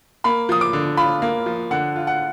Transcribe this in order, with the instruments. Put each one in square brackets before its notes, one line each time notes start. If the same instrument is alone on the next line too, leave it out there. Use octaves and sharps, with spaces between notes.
[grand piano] A#3 [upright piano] B5
[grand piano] F3 [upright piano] D#6
[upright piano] D6
[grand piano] D3
[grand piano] F4 [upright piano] B5
[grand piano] A#3
F3
[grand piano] D3 [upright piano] F#5
[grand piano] F4
[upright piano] F#5